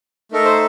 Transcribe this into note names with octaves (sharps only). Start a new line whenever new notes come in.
A3 D#4 A4 A#4
C5